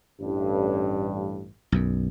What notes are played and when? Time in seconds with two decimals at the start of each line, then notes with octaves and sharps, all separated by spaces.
0.21 A1 G2
1.72 B1 F#2